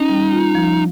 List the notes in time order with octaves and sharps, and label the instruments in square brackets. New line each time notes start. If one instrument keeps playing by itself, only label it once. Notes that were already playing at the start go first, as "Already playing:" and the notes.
Already playing: [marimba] C#4 [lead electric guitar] D#4
[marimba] G3
F4
F3